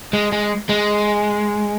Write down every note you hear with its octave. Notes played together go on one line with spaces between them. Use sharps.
G#3
G#3
G#3